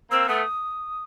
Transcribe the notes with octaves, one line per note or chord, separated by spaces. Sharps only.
A#3 C4 E6
A3 B3 D#6